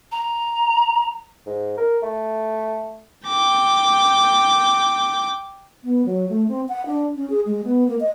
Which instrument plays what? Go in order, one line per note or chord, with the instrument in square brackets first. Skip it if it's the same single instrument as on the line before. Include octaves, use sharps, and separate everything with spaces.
[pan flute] A#5
[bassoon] G#2
A#4
A3
[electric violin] G5 D6
[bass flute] B3
F#3
A3
C4
F#5
D4
C#4
G#4
G#3
B3
A#3
D#5